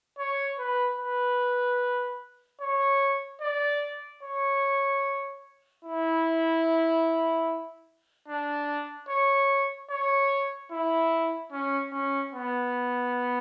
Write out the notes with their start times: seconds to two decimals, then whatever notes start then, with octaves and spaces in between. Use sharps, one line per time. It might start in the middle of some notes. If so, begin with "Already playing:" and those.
0.18 C#5
0.59 B4
0.99 B4
2.61 C#5
3.42 D5
4.23 C#5
5.84 E4
8.28 D4
9.08 C#5
9.90 C#5
10.71 E4
11.52 C#4
11.92 C#4
12.33 B3